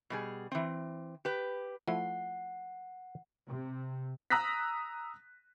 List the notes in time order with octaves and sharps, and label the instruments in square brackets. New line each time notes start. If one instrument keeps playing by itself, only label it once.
[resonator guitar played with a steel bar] B2 G3 G#4
E3 C4
G4 B4
[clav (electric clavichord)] F3 A3 E4 [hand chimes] F#5
[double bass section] C3
[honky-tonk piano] A#5 D#6 E6 F#6 A#6 B6